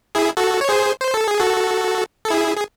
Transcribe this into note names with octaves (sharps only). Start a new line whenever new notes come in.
E4 G#4
F#4 A4
C#5
G#4 C5
C5
A4
G#4
F#4 A4
A4
E4 G#4
G#4